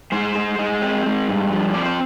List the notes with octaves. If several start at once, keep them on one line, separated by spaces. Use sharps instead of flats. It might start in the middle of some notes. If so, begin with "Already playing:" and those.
G#3 C5
G#3
G#3
C4
G#3
G2
F3
C4 D5
C5